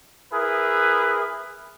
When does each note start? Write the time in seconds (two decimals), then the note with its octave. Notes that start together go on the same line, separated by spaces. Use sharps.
0.32 E4 G#4 A#4 B4